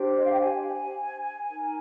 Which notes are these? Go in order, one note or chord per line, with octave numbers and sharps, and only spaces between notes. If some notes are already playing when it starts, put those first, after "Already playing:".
Already playing: D4 G4 C5
D#5
F5
G5
G#5
D#4 A#4